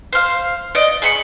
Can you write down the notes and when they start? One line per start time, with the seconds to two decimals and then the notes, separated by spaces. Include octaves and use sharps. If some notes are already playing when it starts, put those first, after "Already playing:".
0.13 C5 F5
0.75 D5 D#5
1.02 G#4 B5 C#6